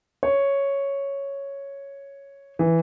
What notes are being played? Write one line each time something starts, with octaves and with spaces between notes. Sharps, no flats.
C#5
E3